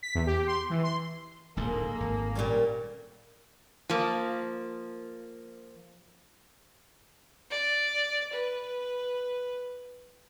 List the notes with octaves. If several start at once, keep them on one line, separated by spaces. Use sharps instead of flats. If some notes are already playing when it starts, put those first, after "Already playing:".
B6
E2
G4
C6
E3
C6
D1 A#1 G#2 G#3 A#3 D#4 A4
G#1
A#2 G3 C#4
F3 A#3
D5
B4